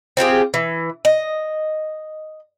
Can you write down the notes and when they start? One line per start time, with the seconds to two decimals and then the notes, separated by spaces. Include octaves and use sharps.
0.17 C4 F4 G4 G#4
0.54 E3
1.05 D#5